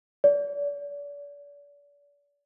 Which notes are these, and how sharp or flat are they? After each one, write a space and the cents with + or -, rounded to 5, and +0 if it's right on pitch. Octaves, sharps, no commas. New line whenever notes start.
D5 -40